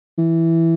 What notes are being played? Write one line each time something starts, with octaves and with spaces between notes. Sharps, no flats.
E3